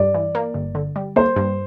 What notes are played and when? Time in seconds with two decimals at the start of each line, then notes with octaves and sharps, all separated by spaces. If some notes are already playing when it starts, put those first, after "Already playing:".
Already playing: G2 D5
0.14 E3
0.35 A#3
0.54 G1
0.75 D3
0.96 G3
1.16 A#3 C5
1.36 G2